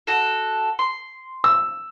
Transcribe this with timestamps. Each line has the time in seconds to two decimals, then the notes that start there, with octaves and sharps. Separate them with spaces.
0.07 F#4 A4
0.79 C6
1.44 E6